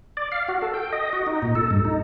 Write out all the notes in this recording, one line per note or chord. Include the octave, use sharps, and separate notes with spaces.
D5
F5
F#4
A4
G5
D#5
F#4
D#4
A#2
A4
G2
D#4